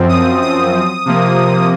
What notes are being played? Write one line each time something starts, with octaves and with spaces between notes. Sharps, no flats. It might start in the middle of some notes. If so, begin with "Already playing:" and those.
Already playing: F#2 F3 C4
D#6
D#6
C3 F3 A#3